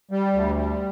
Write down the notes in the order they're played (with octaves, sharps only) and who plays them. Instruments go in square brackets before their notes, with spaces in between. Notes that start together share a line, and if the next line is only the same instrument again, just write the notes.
[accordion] G3
D2
G3